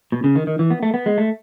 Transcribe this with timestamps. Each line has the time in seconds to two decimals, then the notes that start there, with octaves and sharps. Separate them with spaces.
0.12 B2
0.24 C#3
0.36 D#3
0.47 D#3
0.59 E3
0.71 B3
0.83 A3
0.94 B3
1.06 G#3
1.18 A3